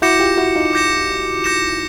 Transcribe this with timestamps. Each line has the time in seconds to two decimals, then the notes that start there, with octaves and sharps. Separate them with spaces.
0.02 E4 F#4 D6 G6 A#6 C#7 E7
0.20 F4 G4
0.37 E4 F#4
0.55 D#4 F4
0.73 D6 G6 A#6 C#7 E7
1.44 D6 G6 A#6 C#7 E7